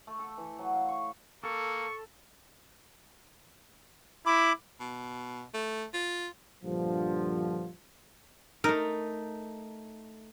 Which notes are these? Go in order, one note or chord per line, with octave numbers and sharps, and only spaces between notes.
A3
A4
E3
F#3
F5
C#6
A#3 A4 C#6
E4 B5 D6
B2
A3
F4
A#1 G2 D3 F3
A3 D#4 A#4